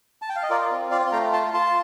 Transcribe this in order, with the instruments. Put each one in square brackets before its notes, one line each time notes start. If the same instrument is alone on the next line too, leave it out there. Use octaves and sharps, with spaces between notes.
[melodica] A5
G5
F5
D#5
F4 A#4 D5
C4
F4 D5 F5
C6
A3 G5 A#5
F4 A5 C6
F4 A5 C6